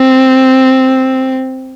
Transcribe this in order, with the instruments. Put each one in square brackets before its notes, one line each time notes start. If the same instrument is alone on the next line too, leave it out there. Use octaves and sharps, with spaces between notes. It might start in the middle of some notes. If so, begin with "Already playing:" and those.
Already playing: [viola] C4